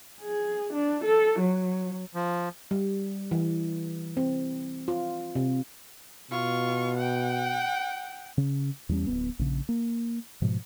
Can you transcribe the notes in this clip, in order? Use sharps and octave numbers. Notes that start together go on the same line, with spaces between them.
G#4
D4
A4
F#3
F3
G3
E3
C4
F4
C3
B2 F4 C#6
F#5 G5
C#3
E2 G3 C#4
D1 G#1 B3
A#1 C#3
A#3
G#2 B2 F3